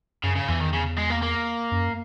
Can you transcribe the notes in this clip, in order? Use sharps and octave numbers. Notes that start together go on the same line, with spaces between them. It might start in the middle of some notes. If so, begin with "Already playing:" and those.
F#2 C#3
C#3
E2 E3
D#3
C#3
G#3
A#3
A#3
F#2